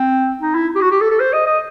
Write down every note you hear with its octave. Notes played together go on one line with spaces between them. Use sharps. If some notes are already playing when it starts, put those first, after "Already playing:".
Already playing: C4
D#4
E4
G4
F#4
G4
A4
A4
C5
D#5
D#5